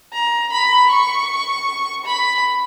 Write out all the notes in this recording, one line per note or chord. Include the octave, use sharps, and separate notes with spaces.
A#5
B5
C#6
B5